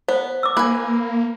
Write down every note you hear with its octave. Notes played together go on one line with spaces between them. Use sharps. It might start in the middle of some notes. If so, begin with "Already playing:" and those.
B3 C5
D6 E6
A#3 B4 G#5